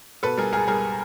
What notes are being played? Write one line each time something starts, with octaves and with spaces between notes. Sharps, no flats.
B2 A4 B4
G3 G#4 A#4
C#2 G#4 A#4
G3 G#4 A#4